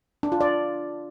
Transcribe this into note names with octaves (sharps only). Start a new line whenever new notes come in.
D4
F4
D5